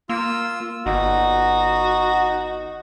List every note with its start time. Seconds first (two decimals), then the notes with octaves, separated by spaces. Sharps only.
0.09 A#3 F4 E6
0.86 G1 D#4 F#4